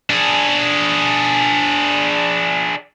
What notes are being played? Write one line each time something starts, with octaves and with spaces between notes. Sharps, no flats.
D4 G#4